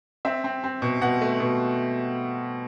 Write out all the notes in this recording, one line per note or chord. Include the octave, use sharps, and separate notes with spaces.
C4 E5
C4
C4
B2
B2 F#5
A3
B2